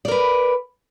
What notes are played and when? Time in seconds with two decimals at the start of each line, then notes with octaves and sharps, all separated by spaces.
0.05 D5
0.08 A#4
0.11 B4